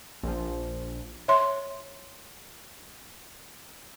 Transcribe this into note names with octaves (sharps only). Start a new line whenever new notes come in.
A#1 F3
C#5 E5 C6